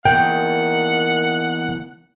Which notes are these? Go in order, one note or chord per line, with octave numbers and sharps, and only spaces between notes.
E2 D#3 A#3 F#5 G5